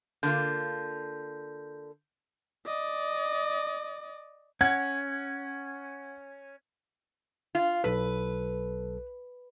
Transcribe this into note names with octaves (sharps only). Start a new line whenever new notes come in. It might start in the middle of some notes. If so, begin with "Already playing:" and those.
D3 A#3 F4 G6
D5 D#5
C#4 F#5 G#6
F4
B1 A4 B4